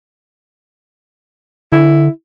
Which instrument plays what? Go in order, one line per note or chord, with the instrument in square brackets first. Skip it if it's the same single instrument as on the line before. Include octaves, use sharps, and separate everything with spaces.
[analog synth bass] D3 [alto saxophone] E4